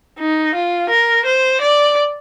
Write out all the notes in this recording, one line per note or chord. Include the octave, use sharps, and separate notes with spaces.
D#4
F4
A#4
C5
D5